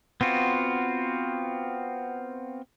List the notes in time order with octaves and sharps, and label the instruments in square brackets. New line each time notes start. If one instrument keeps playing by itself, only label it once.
[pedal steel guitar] B3 C4 F4 F#4